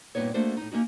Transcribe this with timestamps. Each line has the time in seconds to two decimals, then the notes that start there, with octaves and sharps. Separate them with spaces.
0.15 G2 A#2 F#3 B3 D#4 C#5
0.34 A3 A#3 D4 F#4 C5
0.57 A2 D#4
0.71 A#3 C#4 D#4 F#4